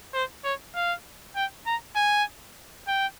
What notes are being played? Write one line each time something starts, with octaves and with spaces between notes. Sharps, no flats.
C5
C#5
F5
G5
A#5
G#5
G5